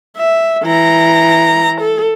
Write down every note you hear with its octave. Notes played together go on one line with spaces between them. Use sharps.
E5
E3 A#5
A4